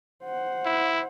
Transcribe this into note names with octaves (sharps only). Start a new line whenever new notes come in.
C5 F#5
E4